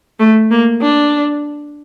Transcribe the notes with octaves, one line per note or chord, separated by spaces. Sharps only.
A3
A#3
D4